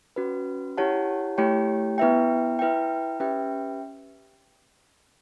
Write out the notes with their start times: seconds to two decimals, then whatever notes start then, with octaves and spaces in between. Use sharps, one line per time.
0.16 C#4 F#4 B4
0.77 E4 G4 C#5 F#5 A5
1.38 A3 E4 G4 C#5 G5
1.98 B3 E4 B4 E5 G5
2.59 E4 B4 E5 G5
3.20 C#4 G4 B4 E5 G5